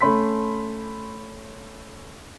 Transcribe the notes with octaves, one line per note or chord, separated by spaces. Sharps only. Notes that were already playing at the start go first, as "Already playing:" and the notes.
A3 C#4 B5 C6 B6